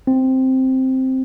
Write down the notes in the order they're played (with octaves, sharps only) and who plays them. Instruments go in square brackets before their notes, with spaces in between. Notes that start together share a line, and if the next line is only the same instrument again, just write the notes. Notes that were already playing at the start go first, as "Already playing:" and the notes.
[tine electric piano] C4